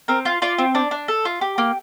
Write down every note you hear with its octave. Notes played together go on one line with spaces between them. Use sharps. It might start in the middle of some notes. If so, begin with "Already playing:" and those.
C4 A#4
F4
F4 D5
C4
D4 D5
D4
A4
F4
G4
A#3